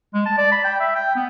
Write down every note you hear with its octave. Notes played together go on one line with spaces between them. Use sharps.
G#3
A5
D5
B5
G5
E5
G5
B3